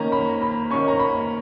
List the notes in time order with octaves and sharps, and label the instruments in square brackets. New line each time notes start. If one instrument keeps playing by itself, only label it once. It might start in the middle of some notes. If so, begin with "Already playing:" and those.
Already playing: [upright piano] D#3 A#3 C#4 A#5
B5
B5
D#3 A#3 C#4 C#6
A#5
B5